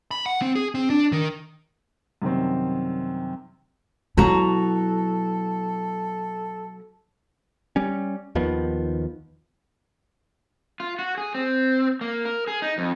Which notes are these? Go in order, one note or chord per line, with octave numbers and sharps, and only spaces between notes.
B5
F#5
C4
G#4
C4
D4
D#3
F#2 C3 D#3 G3 C4
B2 F#3 E4 F#4 A4 A#5
G3 C#4
D#2 D#3 F3 B3
F4
F#4
G#4
C4
A#3
A#4
G#4
D#4
F2